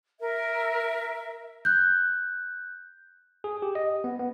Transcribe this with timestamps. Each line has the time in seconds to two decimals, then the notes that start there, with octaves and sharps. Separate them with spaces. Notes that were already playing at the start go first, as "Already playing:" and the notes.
0.21 A#4 E5
1.65 F#6 G6
3.44 G#4
3.62 G4
3.75 D#5
4.04 B3
4.19 B3